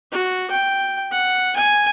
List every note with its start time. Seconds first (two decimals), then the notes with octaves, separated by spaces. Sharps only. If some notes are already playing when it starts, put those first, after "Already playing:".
0.12 F#4
0.51 G5
1.12 F#5
1.56 G#5